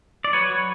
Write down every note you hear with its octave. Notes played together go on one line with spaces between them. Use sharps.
D5
F#3 B4 C#5
F#3